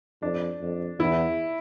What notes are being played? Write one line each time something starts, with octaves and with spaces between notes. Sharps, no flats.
F2 D4
F2
E2 E4